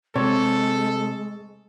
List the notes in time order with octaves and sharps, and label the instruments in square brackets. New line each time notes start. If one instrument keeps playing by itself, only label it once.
[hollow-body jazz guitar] C3 [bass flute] G#3 [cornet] A4 [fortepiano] C#5